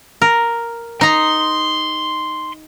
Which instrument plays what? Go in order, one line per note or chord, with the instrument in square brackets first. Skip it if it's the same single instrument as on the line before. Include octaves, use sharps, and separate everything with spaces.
[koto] A#4
[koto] D#4 A#5 [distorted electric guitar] C6